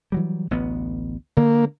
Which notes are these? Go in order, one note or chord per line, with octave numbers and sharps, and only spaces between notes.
E3 F#3 G3
A1 D2 B3
D3 A#3